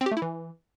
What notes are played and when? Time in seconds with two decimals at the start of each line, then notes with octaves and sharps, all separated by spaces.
0.01 C4
0.06 G4
0.11 A3
0.17 E4
0.22 E3